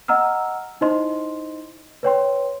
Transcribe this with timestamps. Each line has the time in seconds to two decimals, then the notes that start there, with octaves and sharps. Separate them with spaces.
0.08 D#5 F#5 A#5 E6 F6
0.81 D#4 E4 C5 D#5 C6
2.03 B4 C#5 G5 C6